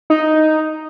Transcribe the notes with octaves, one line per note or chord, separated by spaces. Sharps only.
D#4